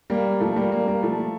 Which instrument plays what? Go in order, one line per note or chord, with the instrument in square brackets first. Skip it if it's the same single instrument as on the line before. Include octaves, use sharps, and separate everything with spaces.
[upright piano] G3 A#3
F3 A3
G3 A#3
G3 A#3
G3 A#3
F3 A3